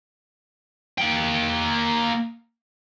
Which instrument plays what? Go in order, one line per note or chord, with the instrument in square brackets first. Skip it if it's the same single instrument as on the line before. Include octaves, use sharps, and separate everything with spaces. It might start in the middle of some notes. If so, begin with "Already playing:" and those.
[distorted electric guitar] A#3 G5